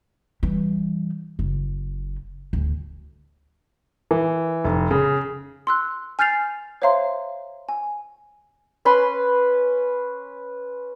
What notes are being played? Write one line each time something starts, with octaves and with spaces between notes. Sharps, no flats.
E3 G3
F#1
D2
E3
F1
C#3
C6 E6 F#6
G#5 F6 G6 A6 C7 F7
C5 C#5 E5 F5 A#5 C6
G#5
C#4 B4 B5 C6